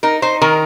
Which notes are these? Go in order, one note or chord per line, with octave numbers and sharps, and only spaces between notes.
D#4 A#4
D#4 C5
D#3 A#4